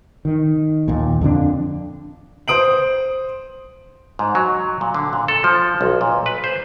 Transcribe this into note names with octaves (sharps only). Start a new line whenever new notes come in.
D#3
D#2 A#2
F2 D3 E3 D4
C5 D#6 D7 F#7
G#2
F#3
A#2
D3
A#2
A4
F3
B1
A#2
B4
C5